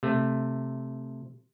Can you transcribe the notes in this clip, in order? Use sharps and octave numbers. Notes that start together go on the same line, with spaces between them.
C3 A3